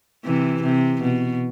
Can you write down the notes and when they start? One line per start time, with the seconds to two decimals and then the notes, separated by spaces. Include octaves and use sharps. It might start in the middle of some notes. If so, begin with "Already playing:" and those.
0.25 C3 E3
0.63 C3
1.01 B2